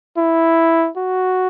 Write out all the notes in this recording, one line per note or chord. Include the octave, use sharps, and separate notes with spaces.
E4
F#4